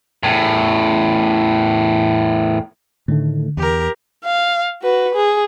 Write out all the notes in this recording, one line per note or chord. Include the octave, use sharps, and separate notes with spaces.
E2 A2
A2 D3 D#3 A3
E2 G4 A#4
F5
F#4 B4
G#4